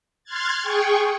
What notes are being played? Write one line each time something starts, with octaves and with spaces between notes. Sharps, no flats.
C6 F6 F#6 G#6 A6
G#4 G5 C#6